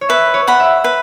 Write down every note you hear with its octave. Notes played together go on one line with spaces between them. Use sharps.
C#5
B4 E5
C#5
F#5 B5
E5
B4